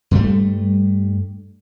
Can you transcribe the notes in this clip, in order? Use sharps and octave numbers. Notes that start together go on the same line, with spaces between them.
G2 G3 A3